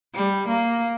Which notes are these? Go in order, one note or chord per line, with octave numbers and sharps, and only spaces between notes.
G3
A#3